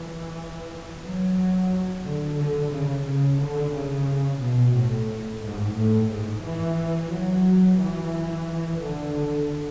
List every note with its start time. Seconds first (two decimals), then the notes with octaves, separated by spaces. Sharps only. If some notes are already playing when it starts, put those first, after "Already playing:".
Already playing: E3
1.03 F#3
2.04 D3
2.39 D3
2.72 C#3
3.05 C#3
3.40 D3
3.73 C#3
4.40 B2
4.74 A2
5.42 G#2
5.76 A2
6.10 G#2
6.43 E3
7.10 F#3
7.78 E3
8.79 D3